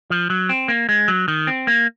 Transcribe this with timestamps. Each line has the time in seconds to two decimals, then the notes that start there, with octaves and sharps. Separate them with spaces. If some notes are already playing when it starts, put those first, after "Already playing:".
0.10 F3
0.30 F#3
0.49 C4
0.68 A#3
0.89 G#3
1.08 F#3
1.28 D#3
1.47 C4
1.67 A#3